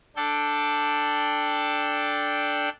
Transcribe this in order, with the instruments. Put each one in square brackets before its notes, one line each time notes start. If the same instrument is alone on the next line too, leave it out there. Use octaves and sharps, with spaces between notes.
[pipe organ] D4 A4 D5 G5